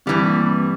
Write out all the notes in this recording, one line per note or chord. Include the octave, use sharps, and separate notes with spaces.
G2 E3 G3 C4
A#3
C4